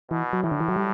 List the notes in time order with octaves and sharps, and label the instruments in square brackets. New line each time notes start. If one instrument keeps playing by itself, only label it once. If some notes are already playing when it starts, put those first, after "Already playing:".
[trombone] B2 [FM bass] E3
[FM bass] F#3
[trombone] A2 [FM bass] E3
[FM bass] D3
E3
F#3
G3